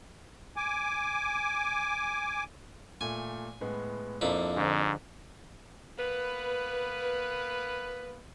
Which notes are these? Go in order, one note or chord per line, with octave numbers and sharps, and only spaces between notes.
G#5 D6
A#2 A3 G#5
A2 G#3 B3
F2 F3 A#3 D4 E4 B5
G#2 D3 F3 D4
A#3 B3 B4